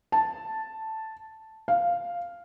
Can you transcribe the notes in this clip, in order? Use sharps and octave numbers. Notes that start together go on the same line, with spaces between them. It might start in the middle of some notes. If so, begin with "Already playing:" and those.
A5
F5